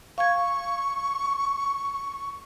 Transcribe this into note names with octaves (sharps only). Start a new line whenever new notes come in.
F5 C#6 G#6